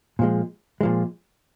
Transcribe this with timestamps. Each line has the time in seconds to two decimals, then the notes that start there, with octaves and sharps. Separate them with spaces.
0.19 A#2 F3 G#3
0.81 A#2 F3 G#3